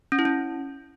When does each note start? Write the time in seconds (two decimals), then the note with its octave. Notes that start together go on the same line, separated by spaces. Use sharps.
0.12 C#4
0.19 E4
0.25 C#4